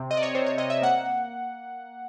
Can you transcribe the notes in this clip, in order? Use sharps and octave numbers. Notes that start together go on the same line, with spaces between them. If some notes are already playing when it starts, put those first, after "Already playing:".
Already playing: C3 C4
C3 D#5
D5
C#5
C3 C5
C#5
C3 D#5
E5
A#3 F#5